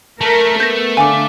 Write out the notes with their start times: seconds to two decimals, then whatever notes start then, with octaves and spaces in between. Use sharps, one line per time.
0.21 A3 A#4 A5 B6
0.60 B3 A#4 B4 G6 A#6
0.97 D3 F5 F#5 G#5 D6